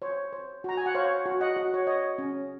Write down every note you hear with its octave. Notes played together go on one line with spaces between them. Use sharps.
C5 C#5
C5
F#4 A#5
G#5
F#5
C5 C#5 F5
F#4
D#5 F#5
F#4
C#5
C#5 D#5
C#4